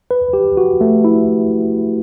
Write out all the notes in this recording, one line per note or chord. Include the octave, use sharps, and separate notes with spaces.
B4
G4
F#4
A3
E4